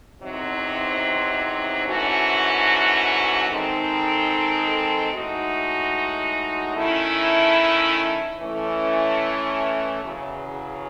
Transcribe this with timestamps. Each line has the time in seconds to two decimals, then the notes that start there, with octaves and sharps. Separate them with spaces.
0.21 E2 C3 F#3 C4 D#4
1.84 G#2 E3 A3 C#4 F#4
3.49 D#3 G#3 C4 D#4 A4
5.11 A2 G#3 D#4 F#4
6.75 D#3 A3 C#4 E4
8.38 E3 A3 C#4
10.02 E2 C#3 F#3